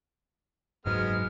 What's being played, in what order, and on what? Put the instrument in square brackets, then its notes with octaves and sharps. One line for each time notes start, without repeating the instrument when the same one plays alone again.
[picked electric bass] F#1 G#2 F#3 [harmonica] G#3 B3 F6